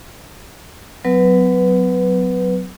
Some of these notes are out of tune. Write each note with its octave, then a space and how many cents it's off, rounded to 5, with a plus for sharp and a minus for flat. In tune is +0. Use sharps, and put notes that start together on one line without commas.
F#3 +0 B3 +40 B4 +0